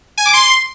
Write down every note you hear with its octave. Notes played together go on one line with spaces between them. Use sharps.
G#5
D6
C6